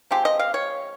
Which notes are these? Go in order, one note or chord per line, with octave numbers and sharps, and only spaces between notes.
F3 G#3 C4 G4
D#5
F5
C#5